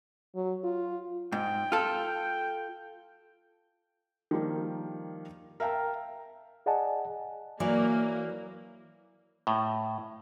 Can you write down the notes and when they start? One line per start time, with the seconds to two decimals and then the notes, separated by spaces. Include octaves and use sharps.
0.35 F#3
0.64 F4
1.32 G#2 G5
1.72 F4 A4
4.31 D#3 F3 G3 A#3
5.60 A#4 E5 F5 G5 A5 A#5
6.66 G#4 D5 D#5 F#5 G#5 A5
7.60 E3 F#3 A#3 E4 D5
9.47 A2